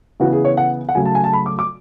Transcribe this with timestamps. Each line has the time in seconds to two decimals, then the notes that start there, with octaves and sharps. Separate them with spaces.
0.20 C#3 E3 B3 E4 F#4
0.32 G#4
0.45 C#5
0.57 F#5
0.89 F#5
0.95 C#3 F#3 A3 G#5
1.06 A5
1.15 G#5
1.24 A5
1.33 B5
1.46 D6
1.59 D6